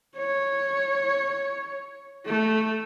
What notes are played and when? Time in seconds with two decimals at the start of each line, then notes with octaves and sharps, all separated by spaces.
0.18 C#5
2.27 A3